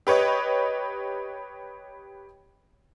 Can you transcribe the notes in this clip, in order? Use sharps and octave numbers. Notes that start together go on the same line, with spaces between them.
G4 B4 C#5 D#5